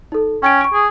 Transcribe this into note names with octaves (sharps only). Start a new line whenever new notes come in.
D#4 A4
C#4 G5 G#6 D7
C#6 D7
G#4